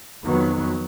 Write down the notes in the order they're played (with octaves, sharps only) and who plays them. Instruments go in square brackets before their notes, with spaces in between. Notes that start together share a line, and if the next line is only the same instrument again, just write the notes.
[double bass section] F2 D#3 F#3 B3